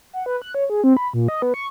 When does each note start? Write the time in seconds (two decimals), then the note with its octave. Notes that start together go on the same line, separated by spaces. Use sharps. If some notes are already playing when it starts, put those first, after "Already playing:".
0.13 F#5
0.26 B4
0.42 F#6
0.55 C#5
0.70 G#4
0.84 C4
0.97 B5
1.13 A#2
1.28 D#5
1.42 B3
1.54 C#6